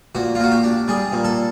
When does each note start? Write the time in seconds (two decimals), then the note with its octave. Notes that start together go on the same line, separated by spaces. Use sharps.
0.15 A#2 F#4
0.35 F4
0.40 A#3 F#4
0.52 G4
0.64 D4
0.88 G3 G#4
1.12 A#2
1.24 A4